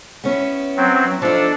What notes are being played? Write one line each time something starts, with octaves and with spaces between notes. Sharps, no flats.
B3 C#4 E4
F#3 C4
F3 D4 D#4 A4